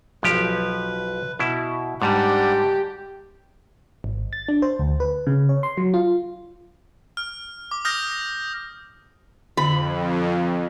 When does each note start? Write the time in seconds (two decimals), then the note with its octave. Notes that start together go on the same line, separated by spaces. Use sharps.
0.23 B1 F3 G4 B4
1.39 B2 E4
2.02 G#2 G3 D4 G4 D5 F#5
4.04 G#1
4.33 A6
4.49 D4
4.62 C5
4.79 D2
5.00 B4
5.27 C#3
5.49 C#5
5.63 C6
5.77 F#3
5.94 F4
7.17 F6
7.71 D6
7.85 D#6 F6 G6 A#6
9.57 F2 D3 B5